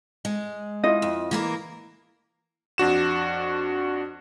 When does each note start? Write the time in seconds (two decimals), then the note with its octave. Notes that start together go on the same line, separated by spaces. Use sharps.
0.25 G#3
0.84 E4 F4 D#5
1.02 F2
1.31 E3 A#3 A#4
2.78 F2 D4 F#4 E7